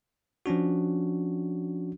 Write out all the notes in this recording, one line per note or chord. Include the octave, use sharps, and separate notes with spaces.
F3 C#4 D4 F#4